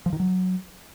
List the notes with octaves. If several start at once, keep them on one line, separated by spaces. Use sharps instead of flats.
F3
D#3
F#3